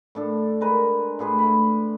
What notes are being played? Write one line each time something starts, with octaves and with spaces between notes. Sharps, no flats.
A2 D4 A4
G#3 A#4 B4
A2 G#4 B4 C6
A3 B5